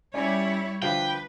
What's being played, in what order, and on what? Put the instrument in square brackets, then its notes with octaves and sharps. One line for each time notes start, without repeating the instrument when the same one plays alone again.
[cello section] G3 E4 C#5 [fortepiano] C#4 D5 G#5
[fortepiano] D3 F3 F5 [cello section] B4 [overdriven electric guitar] G5